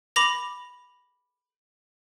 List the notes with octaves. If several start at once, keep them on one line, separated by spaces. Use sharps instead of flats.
B5 D6 A#6 F7